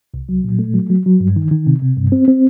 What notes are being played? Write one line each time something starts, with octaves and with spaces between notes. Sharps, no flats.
C2
F#3
A#2
A3
F#3
F#3
F#3
G2
D#3
D#3
C3
C3
G2
C4
C4